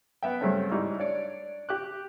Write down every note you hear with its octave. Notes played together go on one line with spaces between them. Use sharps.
B3 E5 G5
G2 C#3 A3 C4 C#4
G#2 G3 D#4 E4
D4 C#5 D5
G4 D6 F#6